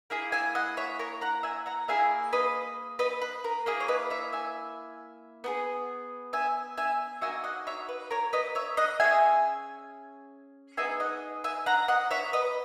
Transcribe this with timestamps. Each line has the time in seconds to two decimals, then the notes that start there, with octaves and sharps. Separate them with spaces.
0.10 A#3 E4 G#4
0.32 E5 G#5
0.55 D#5 F#5
0.77 C#5 E5
0.99 A#4 C#5
1.21 F#5 A#5
1.43 E5 G#5
1.66 F#5 A#5
1.88 A#3 E4 G#4 E5 G#5
2.33 B4 D#5
2.99 B4 D#5
3.22 B4
3.44 A#4
3.66 A#3 E4 G#4
3.80 C#5
3.88 B4 D#5
4.10 C#5 E5
4.33 E5 G#5
5.44 B3 D#4 G#4
6.33 E5 G#5
6.77 E5 G#5
7.21 A#3 D#4 F#4 E5 G#5
7.44 D#5 F#5
7.67 C#5 E5
7.89 B4
8.11 A#4 C#5
8.33 B4 D#5
8.55 C#5 E5
8.77 D#5 F#5
9.00 C#4 G#4 E5 G#5
10.77 B3 D#4 G#4 E5 G#5
11.00 D#5 F#5
11.44 E5 G#5
11.66 F#5 A#5
11.88 D#5 F#5
12.11 C#5 E5
12.33 B4 D#5